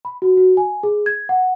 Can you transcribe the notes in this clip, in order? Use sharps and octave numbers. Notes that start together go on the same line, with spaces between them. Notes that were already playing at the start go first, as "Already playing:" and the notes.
B5
F#4
F#4
G#5
G#4
G#6
F#5